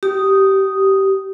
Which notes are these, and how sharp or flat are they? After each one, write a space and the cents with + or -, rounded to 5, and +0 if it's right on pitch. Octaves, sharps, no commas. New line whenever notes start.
G4 -20 D#6 +0